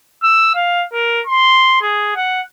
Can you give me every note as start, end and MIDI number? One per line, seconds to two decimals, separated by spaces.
0.23 0.55 88
0.55 0.84 77
0.93 1.21 70
1.26 1.77 84
1.81 2.11 68
2.16 2.41 78